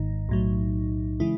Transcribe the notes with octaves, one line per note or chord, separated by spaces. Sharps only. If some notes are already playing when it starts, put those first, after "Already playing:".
Already playing: G#1 G#2 D#3 D#4
B1 A2 F#3
C#3 E3 G#3 E4